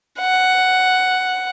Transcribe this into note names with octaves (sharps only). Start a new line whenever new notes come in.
F#5